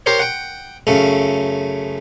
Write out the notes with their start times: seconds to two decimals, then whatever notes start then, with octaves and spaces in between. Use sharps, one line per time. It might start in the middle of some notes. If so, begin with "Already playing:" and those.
0.06 G4 A#4 C5 C#5
0.19 F#5 G5
0.87 F#2 C#3 A3 C#4